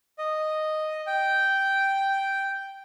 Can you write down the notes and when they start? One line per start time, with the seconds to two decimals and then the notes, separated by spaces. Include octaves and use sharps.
0.18 D#5
1.07 G5